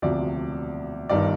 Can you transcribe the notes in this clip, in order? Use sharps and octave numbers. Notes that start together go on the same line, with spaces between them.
E1 D2 C3 F3 D5
G1 G2 D#3 D5